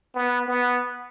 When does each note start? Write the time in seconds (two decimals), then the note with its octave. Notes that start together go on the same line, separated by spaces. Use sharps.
0.15 B3
0.48 B3